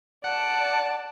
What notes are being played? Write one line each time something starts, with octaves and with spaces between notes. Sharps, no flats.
D5 F#5 A5